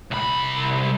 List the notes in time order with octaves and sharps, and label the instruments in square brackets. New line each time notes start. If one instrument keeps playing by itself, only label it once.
[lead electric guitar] C2 B5